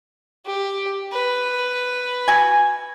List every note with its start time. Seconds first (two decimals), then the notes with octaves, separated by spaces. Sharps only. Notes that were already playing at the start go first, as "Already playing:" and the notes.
0.46 G4
1.12 B4
2.28 F#4 G#5